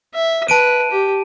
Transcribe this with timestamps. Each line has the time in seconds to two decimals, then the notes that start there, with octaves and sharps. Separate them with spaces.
0.14 E5
0.48 B4 A5 D7 D#7
0.91 G4